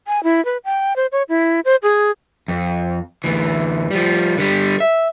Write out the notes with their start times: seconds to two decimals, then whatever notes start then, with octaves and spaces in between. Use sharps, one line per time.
0.07 G#5
0.23 E4
0.45 B4
0.65 G5
0.96 C5
1.12 C#5
1.29 E4
1.65 C5
1.83 G#4
2.48 F2
3.24 D2 E3
3.91 F3 G3
4.38 D3 G3
4.80 E5